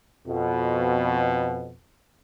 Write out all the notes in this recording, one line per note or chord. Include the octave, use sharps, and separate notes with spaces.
F2 B2